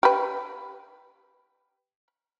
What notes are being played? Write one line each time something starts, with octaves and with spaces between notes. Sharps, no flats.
G4 B4